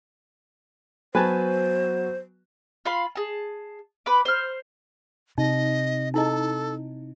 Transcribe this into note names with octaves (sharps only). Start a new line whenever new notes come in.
F#3 B3 F#4 B4 C5 G#5 A5
F4 F5 B5 C6
G#4 A5
B4 B5 D6
C5 F6
C3 D#4 D#5
D#4 E4 A4 D#5